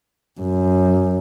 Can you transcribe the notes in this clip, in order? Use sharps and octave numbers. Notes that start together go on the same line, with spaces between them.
F#2